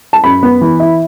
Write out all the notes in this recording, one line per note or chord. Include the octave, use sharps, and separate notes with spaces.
A5
F#2 B5
B3
E3
E4